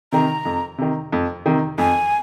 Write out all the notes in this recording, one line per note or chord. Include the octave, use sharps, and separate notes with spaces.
C3 D#3 A#5
F2
C3 D#3
F2
C3 D#3
F2 G#5